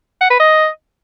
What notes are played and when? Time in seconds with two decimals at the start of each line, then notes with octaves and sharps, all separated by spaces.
0.21 F#5
0.30 B4
0.40 D#5